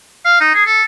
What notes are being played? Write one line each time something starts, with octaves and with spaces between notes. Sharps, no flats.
F5
D#4
G#4
A4